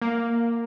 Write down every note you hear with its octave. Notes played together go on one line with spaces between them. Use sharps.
A#3